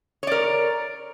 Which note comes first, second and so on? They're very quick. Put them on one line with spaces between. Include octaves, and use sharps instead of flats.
C#5 D5 A#4